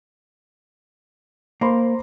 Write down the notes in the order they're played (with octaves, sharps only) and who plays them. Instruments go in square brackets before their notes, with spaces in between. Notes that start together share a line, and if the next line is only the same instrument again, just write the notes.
[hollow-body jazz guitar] A#3 [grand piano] C5 B5 C6